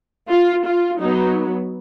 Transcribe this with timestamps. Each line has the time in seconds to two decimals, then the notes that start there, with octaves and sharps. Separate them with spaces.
0.29 F4
0.66 F4
1.00 F#3 B3 D#4